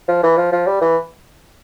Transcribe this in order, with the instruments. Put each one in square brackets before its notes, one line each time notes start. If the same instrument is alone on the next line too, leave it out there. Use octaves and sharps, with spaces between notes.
[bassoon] F3
E3
F3
F3
G3
E3